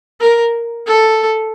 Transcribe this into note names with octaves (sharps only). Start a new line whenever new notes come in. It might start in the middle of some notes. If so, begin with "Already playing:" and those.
A#4
A4